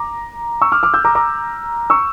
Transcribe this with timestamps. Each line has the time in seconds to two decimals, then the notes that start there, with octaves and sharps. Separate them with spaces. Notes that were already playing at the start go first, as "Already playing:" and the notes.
Already playing: A#5 D6
0.61 C#6 E6
0.72 D6 F6
0.83 D6 F6
0.94 E6 G6
1.05 A#5 D6
1.15 A#5 D6
1.90 C#6 E6